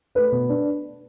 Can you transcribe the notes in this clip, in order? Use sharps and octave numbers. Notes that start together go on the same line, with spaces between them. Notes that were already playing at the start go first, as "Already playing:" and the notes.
A3 B4
B2
D4